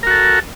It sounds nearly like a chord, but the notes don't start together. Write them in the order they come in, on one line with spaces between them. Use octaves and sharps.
A#4 F#4 A4